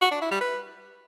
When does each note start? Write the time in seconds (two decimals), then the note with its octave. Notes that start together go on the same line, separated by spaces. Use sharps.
0.01 F#4
0.11 D4
0.21 E4
0.31 G3
0.41 B4